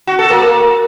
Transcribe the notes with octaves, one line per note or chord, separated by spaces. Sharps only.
F#4
A4
A#3